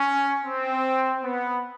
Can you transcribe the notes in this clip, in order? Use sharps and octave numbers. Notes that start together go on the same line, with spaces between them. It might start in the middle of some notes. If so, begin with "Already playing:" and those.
Already playing: C#4
C4
B3